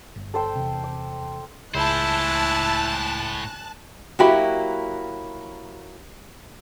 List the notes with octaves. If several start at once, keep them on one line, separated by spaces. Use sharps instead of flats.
G1
A4 C5 G5
E2 C3
D6
C#2 A2 E4 C5 G#5 A5 F#6
F#3 A#3 E4 F#4 G4 B5